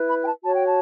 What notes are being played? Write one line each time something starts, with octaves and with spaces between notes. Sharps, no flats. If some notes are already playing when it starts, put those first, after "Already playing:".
Already playing: E4 B4
B5
G5
A5
F#4 C#5 A5
G5
A5